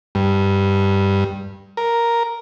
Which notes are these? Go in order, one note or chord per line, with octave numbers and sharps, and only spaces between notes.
G2
A#4